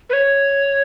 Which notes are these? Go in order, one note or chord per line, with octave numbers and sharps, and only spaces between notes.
B4
C#5